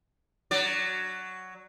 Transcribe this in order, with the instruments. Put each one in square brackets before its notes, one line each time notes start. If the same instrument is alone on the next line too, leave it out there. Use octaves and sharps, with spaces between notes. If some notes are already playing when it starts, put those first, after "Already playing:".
[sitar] F#3 D5